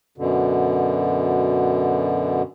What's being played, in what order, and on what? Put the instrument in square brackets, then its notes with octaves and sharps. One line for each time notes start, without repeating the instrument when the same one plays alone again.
[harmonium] F#2 B2 D3